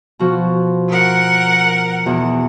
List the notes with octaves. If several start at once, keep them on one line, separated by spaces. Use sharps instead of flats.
B2 F3 F#4
A#4 F#5
E2 B2